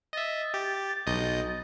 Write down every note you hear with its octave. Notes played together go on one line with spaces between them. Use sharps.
D#5 E5 A6
G4
B1 D#5 G6